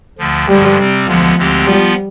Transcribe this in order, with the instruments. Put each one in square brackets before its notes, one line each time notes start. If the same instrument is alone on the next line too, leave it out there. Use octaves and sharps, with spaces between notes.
[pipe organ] D2 D3 F3
[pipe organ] G2 D3 F3 G#3 [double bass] G3
[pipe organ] C3 G3 C4
[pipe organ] D2 D3 G#3 B3 [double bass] F3
[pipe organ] D2 D3 G#3 C4 G4
[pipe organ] F3 B3 F4 [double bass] G3